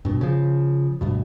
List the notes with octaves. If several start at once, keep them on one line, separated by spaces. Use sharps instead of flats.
G2 B2
C#3 F3
D2 G2 B2